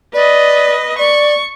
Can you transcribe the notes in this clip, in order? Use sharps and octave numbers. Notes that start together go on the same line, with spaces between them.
B4 D5 D#5
D5 C#6